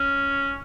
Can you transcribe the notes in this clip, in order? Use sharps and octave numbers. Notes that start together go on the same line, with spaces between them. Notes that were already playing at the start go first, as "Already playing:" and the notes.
Already playing: C#4